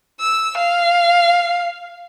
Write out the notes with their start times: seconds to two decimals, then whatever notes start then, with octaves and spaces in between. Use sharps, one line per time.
0.20 E6
0.57 F5